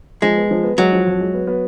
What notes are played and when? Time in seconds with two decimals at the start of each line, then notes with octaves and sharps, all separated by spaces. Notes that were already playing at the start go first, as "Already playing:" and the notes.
0.22 F3 G#3
0.37 B3
0.51 F3
0.64 B3
0.78 F#3 G#3
0.92 F3
1.06 F2
1.21 G#3
1.34 B3
1.47 B3